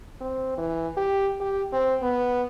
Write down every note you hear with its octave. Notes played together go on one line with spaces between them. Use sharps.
C4
E3
G4
G4
C4
B3